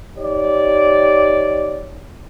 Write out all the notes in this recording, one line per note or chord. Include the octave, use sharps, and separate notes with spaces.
D#4 G4 C#5 D5